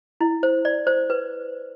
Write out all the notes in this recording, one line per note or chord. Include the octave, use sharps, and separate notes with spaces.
E4
C5
D5
C5
B4